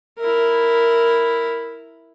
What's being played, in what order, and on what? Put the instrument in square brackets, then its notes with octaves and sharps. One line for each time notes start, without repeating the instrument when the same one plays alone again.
[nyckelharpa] E4 A#4